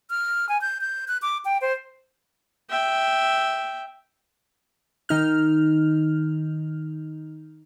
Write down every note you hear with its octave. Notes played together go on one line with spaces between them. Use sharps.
F6
G#5
G6
G6
F#6
D6
G5
C5
E5 G5
D#3 D#4 F6